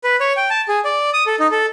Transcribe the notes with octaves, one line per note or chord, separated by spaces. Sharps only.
B4
C#5
G5
A5
G#4
D5
D#6
A4
D#4
A4